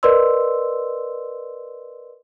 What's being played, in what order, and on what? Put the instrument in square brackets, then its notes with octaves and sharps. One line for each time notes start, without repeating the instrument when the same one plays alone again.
[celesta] A#4 B4 D5 D#5 C6 E6